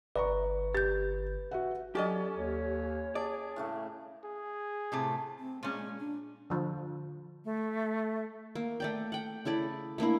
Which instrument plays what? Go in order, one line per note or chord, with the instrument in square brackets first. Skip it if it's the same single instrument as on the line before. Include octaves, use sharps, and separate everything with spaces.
[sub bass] G1 [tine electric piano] B4 [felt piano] D5 A#5 C#6
[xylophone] G4 G6 [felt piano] A6
[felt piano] F#4 E5 F#5
[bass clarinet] F#3 [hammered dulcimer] C#4 [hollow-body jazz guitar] G4 A4 D#5 [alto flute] D5
[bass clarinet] D#2 [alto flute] C#5
[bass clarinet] G#4 [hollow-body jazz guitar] D5 [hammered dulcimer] A5
[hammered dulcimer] A2 C#3 A3
[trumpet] G#4
[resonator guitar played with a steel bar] A2 C3 A3
[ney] C4
[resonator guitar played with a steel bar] A#2 C#4 [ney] G#3
[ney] D4
[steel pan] D3 F3
[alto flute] A3
[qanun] A#3
A3 D5 G5
F#5 G5
C#3 E4 A4 D5
A3 A#3 D4 E4